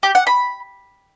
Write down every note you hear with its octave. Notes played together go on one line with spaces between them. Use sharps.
G4
F#5
B5